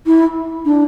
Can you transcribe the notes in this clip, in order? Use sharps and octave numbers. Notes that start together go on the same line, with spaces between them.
E4
D4